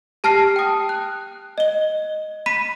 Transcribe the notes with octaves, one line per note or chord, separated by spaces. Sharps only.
G4 A5 F6 A#6 C7
G5 D#6
F#6
D#5 G7
B5 B6 D#7